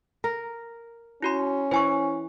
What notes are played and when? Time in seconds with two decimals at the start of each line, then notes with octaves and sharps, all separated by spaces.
0.24 A#4
1.22 C#4 E4 F#4 C6
1.71 E3 C5 G#5 C#6